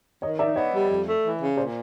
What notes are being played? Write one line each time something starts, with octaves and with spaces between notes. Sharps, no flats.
D#3 C#5 D#5
D#4 D5 E5
B3 C#5 D#5
G3
F2
A3
E3
C#3
A#2 C5 D5